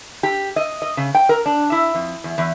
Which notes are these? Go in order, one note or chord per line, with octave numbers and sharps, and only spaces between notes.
G4
D#5
D#5
C#3
G5
A#4
D4
E4
F2
E2
E2